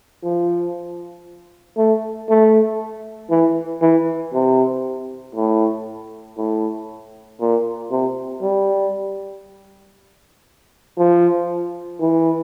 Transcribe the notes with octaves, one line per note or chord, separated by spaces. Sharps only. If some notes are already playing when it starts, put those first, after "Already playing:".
F3
A3
A3
E3
E3
C3
A2
A2
A#2
C3
G3
F3
E3